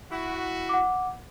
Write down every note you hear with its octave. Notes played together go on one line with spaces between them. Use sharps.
E4 F#4
F#5 D6